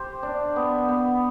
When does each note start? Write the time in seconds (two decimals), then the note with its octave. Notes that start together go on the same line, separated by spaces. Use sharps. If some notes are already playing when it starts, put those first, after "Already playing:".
Already playing: G4 C5
0.23 D4
0.56 B3
0.89 B3